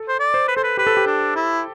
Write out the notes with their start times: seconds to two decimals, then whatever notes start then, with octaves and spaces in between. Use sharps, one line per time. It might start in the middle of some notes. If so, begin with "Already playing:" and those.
Already playing: A4
0.08 C5
0.20 D5
0.34 C5
0.48 B4
0.56 A4 C5
0.63 B4
0.77 G4 B4
0.87 A4
0.97 G4
1.07 D4
1.36 E4